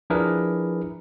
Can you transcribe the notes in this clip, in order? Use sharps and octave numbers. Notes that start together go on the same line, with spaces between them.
F3 D4 E4 G#4 A#4 B4